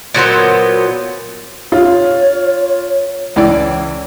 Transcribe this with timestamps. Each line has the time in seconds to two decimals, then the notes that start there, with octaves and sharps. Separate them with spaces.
0.14 A#2 F#3 B3 C5
1.72 F4 C#5
3.36 C#2 E3 D5